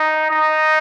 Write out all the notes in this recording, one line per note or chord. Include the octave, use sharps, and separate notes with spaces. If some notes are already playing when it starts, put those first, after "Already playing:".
Already playing: D#4
D#4